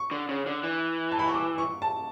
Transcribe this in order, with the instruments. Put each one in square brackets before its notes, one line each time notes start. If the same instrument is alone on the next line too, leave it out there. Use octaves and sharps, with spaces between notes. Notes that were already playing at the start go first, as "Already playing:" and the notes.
Already playing: [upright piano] C#6
[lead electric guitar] D3
C#3
D3
E3
[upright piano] A5
B5
C#6
D6
C#6
A5